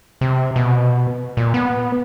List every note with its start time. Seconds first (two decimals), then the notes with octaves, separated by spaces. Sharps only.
0.21 C3
0.56 B2
1.37 A#2
1.54 B3